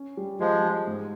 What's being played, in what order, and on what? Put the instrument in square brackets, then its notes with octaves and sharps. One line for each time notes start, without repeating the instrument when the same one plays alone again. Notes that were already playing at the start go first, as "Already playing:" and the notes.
Already playing: [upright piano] C#4
G3
[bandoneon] F3 G#3 [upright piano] G3
[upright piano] G3
G#2